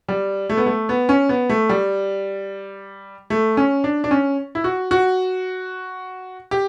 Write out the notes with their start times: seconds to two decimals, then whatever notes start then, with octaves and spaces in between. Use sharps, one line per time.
0.08 G3
0.49 A3
0.57 B3
0.66 A3
0.89 B3
1.09 C#4
1.29 B3
1.49 A3
1.69 G3
3.30 A3
3.57 C#4
3.84 D4
4.04 D4
4.11 C#4
4.55 E4
4.64 F#4
4.91 F#4
6.51 G4